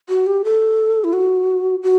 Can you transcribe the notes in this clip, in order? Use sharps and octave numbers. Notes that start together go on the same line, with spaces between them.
F#4
G4
A4
E4
F#4
F#4